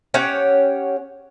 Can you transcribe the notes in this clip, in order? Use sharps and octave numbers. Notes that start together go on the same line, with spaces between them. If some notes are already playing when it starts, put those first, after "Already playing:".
C#4 G4 C#5 F#5